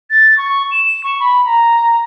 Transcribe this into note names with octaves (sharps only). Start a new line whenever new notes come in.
A6
C#6
E7
C#6
B5
A#5